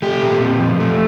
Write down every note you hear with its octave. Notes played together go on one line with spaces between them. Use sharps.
A3 G4
A#2
C4
F3
A3